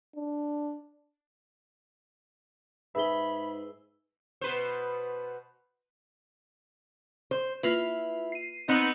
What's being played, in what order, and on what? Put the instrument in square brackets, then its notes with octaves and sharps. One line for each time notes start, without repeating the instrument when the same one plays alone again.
[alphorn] D4
[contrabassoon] G#2 [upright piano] G#4 E5 [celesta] B4 G7 [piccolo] B5
[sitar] B2 B4 C5
[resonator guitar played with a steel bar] C5
[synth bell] A#3 F4 B4 [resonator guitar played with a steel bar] E4
[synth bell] C7 D#7
[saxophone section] B3 D#4 [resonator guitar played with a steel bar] C4